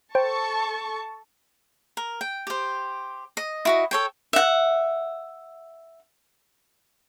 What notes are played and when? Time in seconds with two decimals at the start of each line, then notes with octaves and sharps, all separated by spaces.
0.15 A4 C5 G5 A5 C#6
1.97 A#4
2.21 G5
2.47 G4 C5
3.37 D#5
3.65 E4 F#4 D#5
3.91 A4 C#5 G5
4.33 E5 F#5